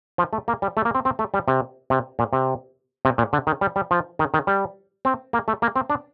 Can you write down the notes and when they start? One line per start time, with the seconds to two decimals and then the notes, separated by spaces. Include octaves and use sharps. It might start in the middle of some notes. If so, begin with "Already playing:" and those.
0.18 F3
0.33 A3
0.48 A#3
0.62 G3
0.77 A3
0.85 A#3
0.95 C4
1.05 C4
1.19 A3
1.34 G3
1.48 C3
1.90 C3
2.19 A#2
2.33 C3
3.05 C3
3.18 A#2
3.33 D3
3.47 D#3
3.61 G3
3.76 G3
3.91 F3
4.19 D#3
4.34 D#3
4.47 G3
5.05 C4
5.33 A#3
5.48 A3
5.62 A#3
5.76 C4
5.90 D4